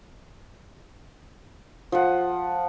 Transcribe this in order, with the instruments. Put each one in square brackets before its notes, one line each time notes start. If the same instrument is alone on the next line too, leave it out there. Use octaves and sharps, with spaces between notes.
[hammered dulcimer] F3 F#5